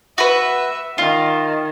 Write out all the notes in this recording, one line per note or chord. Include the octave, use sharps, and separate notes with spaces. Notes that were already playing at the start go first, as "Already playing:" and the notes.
F#4 B4 E5
D#3 F4